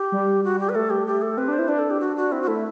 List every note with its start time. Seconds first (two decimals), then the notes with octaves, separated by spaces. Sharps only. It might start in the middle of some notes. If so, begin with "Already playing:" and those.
Already playing: G4
0.12 G3
0.44 F#4
0.60 G4
0.69 B4
0.75 A3 A4
0.90 G4
1.07 G4
1.22 A4
1.37 C4 B4
1.48 D4 C5
1.59 E4
1.68 D4 B4
1.79 A4
1.90 G4
2.00 F#4
2.16 F#4
2.32 C4 E4
2.42 F#4
2.47 A3 E4